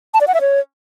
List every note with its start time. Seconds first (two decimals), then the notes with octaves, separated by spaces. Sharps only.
0.14 A5
0.21 D5
0.27 F#5
0.34 E5
0.41 C#5